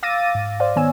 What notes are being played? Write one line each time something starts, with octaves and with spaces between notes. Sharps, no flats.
F5 D6 E6 A6 A#6 D#7
G#2
C5 D5 F5
D#3 B3 C#5 G#5 E6